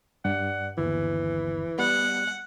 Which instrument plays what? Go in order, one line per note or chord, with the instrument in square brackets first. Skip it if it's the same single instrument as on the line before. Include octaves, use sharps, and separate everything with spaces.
[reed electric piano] G2 [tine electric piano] D5 [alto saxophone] F#5
[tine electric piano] G1 D#2 [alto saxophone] E3
[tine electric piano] G3 [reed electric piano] B3 [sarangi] F#5